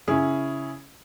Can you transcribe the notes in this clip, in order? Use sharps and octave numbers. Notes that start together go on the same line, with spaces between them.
C#3 C#4 E4 G#4